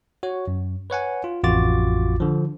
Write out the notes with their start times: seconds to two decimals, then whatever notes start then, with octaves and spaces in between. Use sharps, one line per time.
0.23 F#4 C#5
0.48 F#2
0.90 B4 C#5 F#5 G#5
1.24 F4
1.43 A1 F2 F4 F#4 D6 A6
2.20 D3 F3